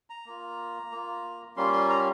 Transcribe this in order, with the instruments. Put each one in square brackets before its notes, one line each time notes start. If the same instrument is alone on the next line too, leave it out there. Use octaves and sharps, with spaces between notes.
[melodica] A#5
A#3 F4
A#3 F4
G3 A#3 C#4 F4 C6
C6
A#5